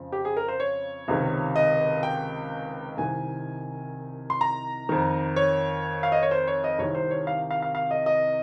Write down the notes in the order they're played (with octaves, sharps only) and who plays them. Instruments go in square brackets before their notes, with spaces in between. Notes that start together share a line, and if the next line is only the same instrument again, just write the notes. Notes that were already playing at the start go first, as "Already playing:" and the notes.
Already playing: [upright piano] F2 C#3 F3
G4
G#4
A#4
C5
C#5
C#2 C3 D#3
D#5
G5
C2 C3 D#3 G#5
C6
A#5
F2 D#3
C#5
F5
D#5
C#5
C5
C#5
D#5
C2 C3 D#3 C#5
C5
C#5
F5
F5
F5
F5
D#5
D#5